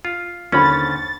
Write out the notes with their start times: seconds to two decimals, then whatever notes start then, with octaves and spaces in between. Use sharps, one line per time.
0.05 F4
0.52 D#2 D3 C#4 C5 B5 A6